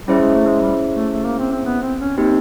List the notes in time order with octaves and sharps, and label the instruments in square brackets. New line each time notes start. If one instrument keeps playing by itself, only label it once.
[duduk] G3 [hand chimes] C#4 E4 G#4 C5 E5
[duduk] G#3
A3
G#3
G3
A3
A3
A#3
C4
C4
B3
C4
C#4
[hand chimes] A#3 D#4 G4 [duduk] C4